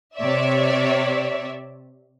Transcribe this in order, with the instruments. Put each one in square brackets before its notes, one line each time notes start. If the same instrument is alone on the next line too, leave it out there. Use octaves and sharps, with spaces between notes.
[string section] C3 C#5 D5 E5